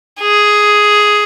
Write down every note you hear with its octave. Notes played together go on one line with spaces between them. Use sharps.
G#4